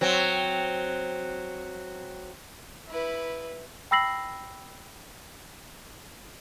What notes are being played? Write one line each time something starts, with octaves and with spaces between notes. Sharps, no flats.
F#3 C4
E4 B4
G5 B5 E6 A#6 C7 F#7